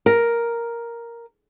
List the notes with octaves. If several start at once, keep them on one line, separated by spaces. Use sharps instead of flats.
A#4